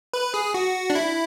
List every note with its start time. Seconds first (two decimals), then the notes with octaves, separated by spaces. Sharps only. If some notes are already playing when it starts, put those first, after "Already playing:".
0.14 B4
0.34 G#4
0.54 F#4
0.90 D4
0.95 E4